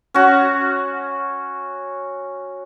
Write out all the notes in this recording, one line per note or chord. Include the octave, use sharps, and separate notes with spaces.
C#4 F#4